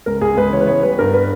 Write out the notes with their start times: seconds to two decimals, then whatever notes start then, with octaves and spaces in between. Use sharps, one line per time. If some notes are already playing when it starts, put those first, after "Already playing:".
0.06 C#2 A#4
0.21 C#2 G#4
0.37 C#2 B4
0.52 E3 C#5
0.61 B4
0.67 B3 C#5
0.83 G3 B4
0.99 G2 A#4
1.14 B3 B4